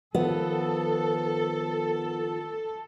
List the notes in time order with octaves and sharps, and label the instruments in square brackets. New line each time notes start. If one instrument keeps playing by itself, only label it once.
[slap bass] D#3 F3 [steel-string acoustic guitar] B3 [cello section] A4